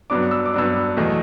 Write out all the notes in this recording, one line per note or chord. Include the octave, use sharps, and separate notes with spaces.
G2 F#3 B3 D4 D6
E6
D6
G2 F#3 B3 D4 E6
E2 B2 F#3 A3